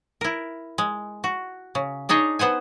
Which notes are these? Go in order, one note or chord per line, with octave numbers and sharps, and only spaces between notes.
E4 A#4
G#3
F#4
C#3
D4 D#4 G#4 C#5 D#5
B3 C5 F#5 G#5